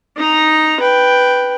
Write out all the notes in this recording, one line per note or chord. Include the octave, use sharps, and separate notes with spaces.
D#4 A#5
B4 G5